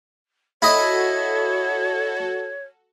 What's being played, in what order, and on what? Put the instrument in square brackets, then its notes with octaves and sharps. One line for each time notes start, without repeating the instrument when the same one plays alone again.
[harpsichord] E4 D#5 [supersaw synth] F#4 A4 [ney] C#5